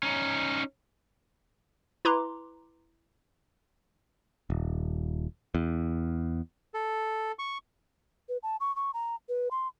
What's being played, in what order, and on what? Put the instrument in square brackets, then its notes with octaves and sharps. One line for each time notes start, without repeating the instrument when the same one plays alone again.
[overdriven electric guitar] C#4 D#4
[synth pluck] E4 B4 A#5 C6 D6
[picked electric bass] D#1
E2
[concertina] A4
C#6
[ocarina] B4
A5
C#6
C#6
A#5
B4
C6